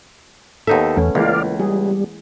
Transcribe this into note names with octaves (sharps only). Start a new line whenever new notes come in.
D#2 B3 D#4 A4 E5
E2 A3 C#4
C#2 E3 G#3 A#3 D5 F5
G3 G#4